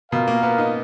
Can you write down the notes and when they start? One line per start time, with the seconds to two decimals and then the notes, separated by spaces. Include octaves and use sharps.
0.12 B2 F4 A#4 F5
0.28 A#3
0.43 B3
0.58 D#4